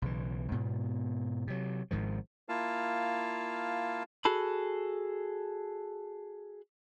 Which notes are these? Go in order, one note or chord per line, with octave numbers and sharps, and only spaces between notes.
B1 C#3 E3
G#2 B2 B3
C3 F#3
G#1 G#2 D#3 F3
A#3 E4 F4 F5 A5
F#4 G#4 A4 B5